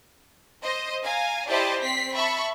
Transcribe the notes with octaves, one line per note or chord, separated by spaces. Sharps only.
C5 D#5
F5 G#5 A#5
E4 G4 C5 D5 D#5 A5
C4 B6 C7
E5 A5 B5 C#6